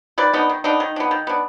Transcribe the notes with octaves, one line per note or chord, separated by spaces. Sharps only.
D#3 B4 D5
B3 D4 D#4
D#3
B3 D4 D#4
D#3
B3 D4
D#3
B3 D4